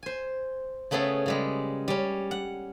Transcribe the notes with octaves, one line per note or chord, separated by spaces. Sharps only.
C5 G#5
C#3 A3 B3 C#4 G#4 A4
C#3 G3 G#3
G3 C#4
F#5